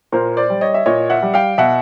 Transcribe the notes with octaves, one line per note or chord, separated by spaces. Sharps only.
A#2 A#4 C5
C5 D5
G3
C#5 D#5
E5
A#2 C#5 D#5
E5 F#5
G3
F5 G5
B2 E5 F#5